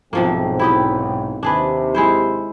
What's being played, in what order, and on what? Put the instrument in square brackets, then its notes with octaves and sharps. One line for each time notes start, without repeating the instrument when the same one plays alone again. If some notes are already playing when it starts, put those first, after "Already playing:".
[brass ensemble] B1 G#2 G5 [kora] C3 F3 A#3
[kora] E4 G4 D#5
[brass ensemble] D#2 C3 [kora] D4 G#4 B4
[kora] G#3 E4 C5